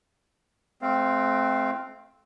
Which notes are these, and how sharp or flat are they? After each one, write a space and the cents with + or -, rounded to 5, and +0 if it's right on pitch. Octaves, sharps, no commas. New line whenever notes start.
A3 -40 C4 +0 F5 +0